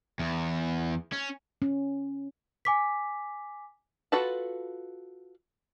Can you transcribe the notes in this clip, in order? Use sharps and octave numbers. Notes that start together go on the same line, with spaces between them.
E2
C#4
C#4
G#5 D6 B6
F4 F#4 A4 B4 A5